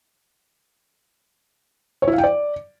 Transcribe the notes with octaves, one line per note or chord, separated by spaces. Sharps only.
C#5
E4
F5
G5
D5